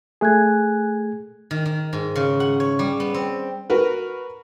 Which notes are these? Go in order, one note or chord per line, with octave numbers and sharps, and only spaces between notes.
A3 G#4 G#5 F#6 G#6
D#3
D#3
G#2
C#3
F#5
C#5
G3
B3
C4
F#4 A#4 B4